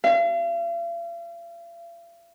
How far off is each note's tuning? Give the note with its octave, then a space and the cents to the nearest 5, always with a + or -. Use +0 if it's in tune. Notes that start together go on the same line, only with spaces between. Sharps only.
F5 -45